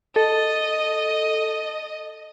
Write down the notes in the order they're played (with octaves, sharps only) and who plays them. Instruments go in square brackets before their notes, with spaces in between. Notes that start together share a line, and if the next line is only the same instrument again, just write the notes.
[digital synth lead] A4 [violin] D#5